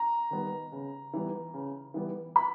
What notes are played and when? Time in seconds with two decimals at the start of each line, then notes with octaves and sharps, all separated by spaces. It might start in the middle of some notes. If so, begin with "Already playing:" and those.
Already playing: A#5
0.31 D#3 G3 B3
0.72 C#3
1.13 E3 G3 B3
1.54 C#3
1.94 E3 G3 B3
2.36 B5